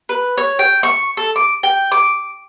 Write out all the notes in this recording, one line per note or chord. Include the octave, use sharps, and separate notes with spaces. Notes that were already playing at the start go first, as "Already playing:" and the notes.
B4
C#5
G5
C#6
A4
D6
G5
D6